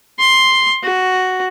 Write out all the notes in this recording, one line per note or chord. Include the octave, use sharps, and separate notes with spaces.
C6
F#4